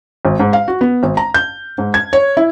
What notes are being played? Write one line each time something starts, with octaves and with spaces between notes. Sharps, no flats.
G#1
G#2
F5
F#4
B3
G#1
A#5
G6
G#2
G#6
C#5
E4